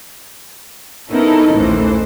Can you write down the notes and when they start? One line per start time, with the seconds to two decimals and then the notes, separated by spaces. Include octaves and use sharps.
1.11 B3 C#4 D#4 E4 A4 A#4
1.52 A#1 D#2 A2 E3 C5